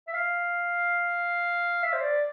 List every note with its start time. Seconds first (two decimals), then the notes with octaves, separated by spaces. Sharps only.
0.08 E5
0.13 F5
1.83 E5
1.93 C5
2.01 D5